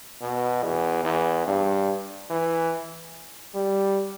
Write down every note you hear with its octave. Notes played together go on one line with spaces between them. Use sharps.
B2
E2
E2
G2
E3
G3